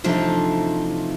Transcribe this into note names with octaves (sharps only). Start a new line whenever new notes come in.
C3 E3 F3 A3 D4 D#4